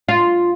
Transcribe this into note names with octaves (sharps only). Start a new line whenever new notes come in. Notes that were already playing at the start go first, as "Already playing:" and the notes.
F4